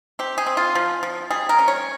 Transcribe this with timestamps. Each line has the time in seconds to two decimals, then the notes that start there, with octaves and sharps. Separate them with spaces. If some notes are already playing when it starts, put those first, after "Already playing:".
0.19 C4 G4
0.38 G#4
0.47 C4
0.57 F4
0.75 F3
1.03 F3
1.30 G3 G#4
1.49 A#4
1.59 C#4
1.68 C#5